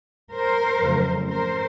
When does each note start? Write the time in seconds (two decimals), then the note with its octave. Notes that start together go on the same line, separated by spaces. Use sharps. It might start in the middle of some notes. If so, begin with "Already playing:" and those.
0.32 A#4 C5
0.80 F2 C#3 F#3 A3
1.28 A#4 C5